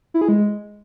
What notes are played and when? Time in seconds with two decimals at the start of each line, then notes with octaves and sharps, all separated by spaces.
0.14 E4
0.21 G#4
0.29 G#3